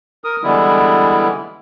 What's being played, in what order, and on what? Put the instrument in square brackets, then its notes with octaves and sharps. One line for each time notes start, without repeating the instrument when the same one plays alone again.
[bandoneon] A#4 D#6
D3 E3 G3 G#3 B3 E4